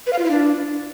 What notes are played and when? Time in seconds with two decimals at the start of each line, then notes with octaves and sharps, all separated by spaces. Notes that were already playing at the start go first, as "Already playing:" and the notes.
0.07 B4
0.13 F5
0.19 F4
0.25 E4
0.31 D4